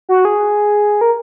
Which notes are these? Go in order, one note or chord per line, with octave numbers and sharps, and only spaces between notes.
F#4
G#4
A#4